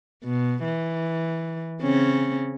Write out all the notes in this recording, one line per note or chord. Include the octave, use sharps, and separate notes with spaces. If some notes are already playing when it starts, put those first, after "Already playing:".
B2
E3
C#3 C4 C#4